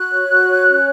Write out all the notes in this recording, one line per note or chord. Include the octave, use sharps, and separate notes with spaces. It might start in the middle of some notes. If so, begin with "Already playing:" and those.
Already playing: F#4 F#6
C#5
F#4
C#5
C#4